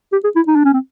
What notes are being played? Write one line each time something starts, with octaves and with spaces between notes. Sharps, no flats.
G4
G#4
E4
D#4
D4
C#4
C4